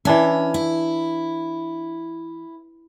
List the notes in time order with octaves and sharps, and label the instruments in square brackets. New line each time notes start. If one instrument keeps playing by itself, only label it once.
[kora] E3 D4 E5 [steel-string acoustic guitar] C#4
[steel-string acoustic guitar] E4